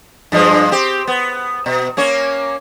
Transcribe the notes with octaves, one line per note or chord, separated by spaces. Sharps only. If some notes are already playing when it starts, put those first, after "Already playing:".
G2 F3 G#3
C4 G4
B3
B2
A#3 C#4 C#5